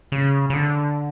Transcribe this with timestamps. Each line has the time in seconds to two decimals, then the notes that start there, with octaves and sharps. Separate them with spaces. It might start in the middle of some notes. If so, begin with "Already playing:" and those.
0.12 C#3
0.50 C#3
0.54 D3